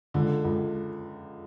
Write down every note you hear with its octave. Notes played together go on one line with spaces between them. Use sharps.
C#2 D3
C#2